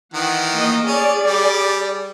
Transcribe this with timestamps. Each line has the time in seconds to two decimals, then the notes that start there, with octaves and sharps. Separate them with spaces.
0.14 D#3 E3 F#5
0.56 A#3 D#5
0.86 C#4 G#4 D5
1.26 G3